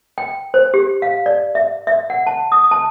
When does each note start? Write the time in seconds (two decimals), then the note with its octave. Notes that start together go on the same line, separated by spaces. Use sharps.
0.18 G5
0.54 C5
0.74 G4
1.02 F5
1.26 D5
1.55 E5
1.87 E5
2.10 F#5
2.27 A5
2.52 D#6
2.71 A5